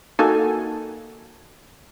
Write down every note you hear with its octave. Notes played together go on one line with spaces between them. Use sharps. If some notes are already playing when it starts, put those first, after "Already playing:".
A#3 D#4 F#4 A4 G#5